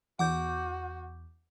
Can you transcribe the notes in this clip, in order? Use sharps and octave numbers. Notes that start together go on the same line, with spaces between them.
E2 F#4 F#5 D6 G6